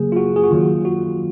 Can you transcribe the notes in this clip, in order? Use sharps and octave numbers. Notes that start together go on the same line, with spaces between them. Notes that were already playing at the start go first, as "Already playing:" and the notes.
Already playing: C#3 F#3 A#3 G#4
F4
F#4
G#4
F#4
D#3 F#3 A#3 F4
F#4